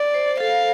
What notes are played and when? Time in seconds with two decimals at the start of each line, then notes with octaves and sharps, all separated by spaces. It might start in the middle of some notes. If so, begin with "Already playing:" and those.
Already playing: D5
0.14 C5
0.40 A4 F5